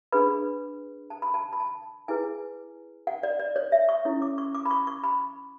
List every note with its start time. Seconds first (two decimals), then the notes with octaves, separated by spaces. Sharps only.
0.12 D4 G#4 B4 B5
1.10 A5
1.22 B5
1.34 A5
1.53 B5
1.60 A5
2.08 E4 G#4 B4 G#5
3.07 F#5
3.23 D5
3.39 D5
3.56 C#5
3.72 E5
3.89 C#6
4.05 C#4 E4 A4 C#5 C#6
4.22 D6
4.38 C#6
4.55 D6
4.65 B5
4.71 C#6
4.87 C#6
5.04 B5